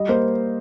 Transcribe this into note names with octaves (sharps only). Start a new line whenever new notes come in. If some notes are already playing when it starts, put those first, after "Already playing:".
Already playing: G3 D#5
A#3 C5